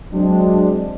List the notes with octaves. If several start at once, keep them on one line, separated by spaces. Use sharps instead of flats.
F#3 G#3 C4 D4